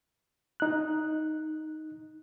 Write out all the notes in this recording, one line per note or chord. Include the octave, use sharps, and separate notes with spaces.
D#4 F#6